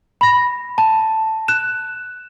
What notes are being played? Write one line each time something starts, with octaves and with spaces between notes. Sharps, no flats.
B5 A#6
A5
F#6 E7